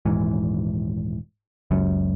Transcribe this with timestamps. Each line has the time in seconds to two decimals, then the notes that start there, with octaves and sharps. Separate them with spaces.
0.05 D#1 G#2 E3
1.71 F#1 C#2 F#2